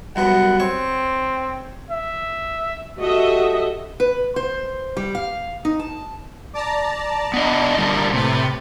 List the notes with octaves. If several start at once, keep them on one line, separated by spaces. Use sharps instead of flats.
C2 F#2 B3 F#5
C4 C#5
E5
F#4 G4 A4 D#5 E5
B4
C5
G3
F5
D#4
A5
D5 A5 A#5
B3 D4 D#5
D3 G3 A#3
A2 C3 B4 A6